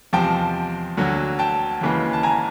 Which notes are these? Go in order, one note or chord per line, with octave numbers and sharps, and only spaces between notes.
E2 C3 F3 G#3 G5 A5
D2 D3 F#3
G5 A5
D#2 C#3 E3 G#3
A5
G#5 A#5